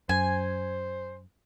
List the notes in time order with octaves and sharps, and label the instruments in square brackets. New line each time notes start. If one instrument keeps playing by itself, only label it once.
[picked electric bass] F#2 [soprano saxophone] C5 [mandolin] G#5